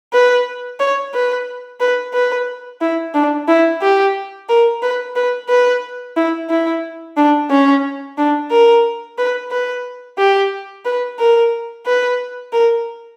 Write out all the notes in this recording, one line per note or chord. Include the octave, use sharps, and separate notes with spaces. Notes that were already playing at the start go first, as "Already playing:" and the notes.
B4
C#5
B4
B4
B4
E4
D4
E4
G4
A#4
B4
B4
B4
E4
E4
D4
C#4
D4
A#4
B4
B4
G4
B4
A#4
B4
A#4